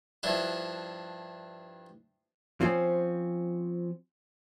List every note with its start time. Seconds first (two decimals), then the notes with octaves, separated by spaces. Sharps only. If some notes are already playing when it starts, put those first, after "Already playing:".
0.23 G2 F3 D4 E4
2.61 F3 C4 C#4